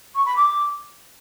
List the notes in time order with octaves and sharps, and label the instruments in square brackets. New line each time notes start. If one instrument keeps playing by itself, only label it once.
[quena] C#6
B5
D6